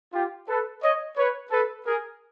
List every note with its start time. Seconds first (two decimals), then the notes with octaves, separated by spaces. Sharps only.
0.13 F4 G4
0.48 A4 B4
0.82 C#5 D#5
1.17 B4 C#5
1.51 A4 B4
1.86 G#4 A#4